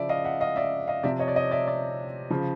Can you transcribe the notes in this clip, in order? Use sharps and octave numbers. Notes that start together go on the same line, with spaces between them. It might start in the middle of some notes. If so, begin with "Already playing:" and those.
Already playing: C#3 F3 D5 E5
D#5 F5
E5 F#5
D#5 F5
D5 E5
D#5 F5
C3 F3 D5 E5
C#5 D#5
D5
C#5 D#5
D5 E5
D5 E5
C#3 F3